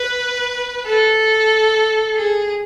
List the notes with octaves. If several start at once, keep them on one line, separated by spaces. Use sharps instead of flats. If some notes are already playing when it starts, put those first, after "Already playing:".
Already playing: B4
A4
G#4